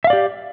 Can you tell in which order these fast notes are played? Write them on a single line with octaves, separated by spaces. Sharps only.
E5 F5 D5 G4